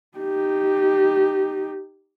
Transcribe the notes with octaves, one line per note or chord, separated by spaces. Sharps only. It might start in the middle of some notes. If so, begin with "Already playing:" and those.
D#4 G4